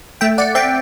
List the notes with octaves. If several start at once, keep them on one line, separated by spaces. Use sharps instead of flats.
A3 E5 G5
D5 F#5
C4 E5 G5